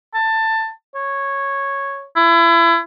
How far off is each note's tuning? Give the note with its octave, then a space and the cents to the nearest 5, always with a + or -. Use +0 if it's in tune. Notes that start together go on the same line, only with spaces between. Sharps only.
A5 +15
C#5 -5
E4 +30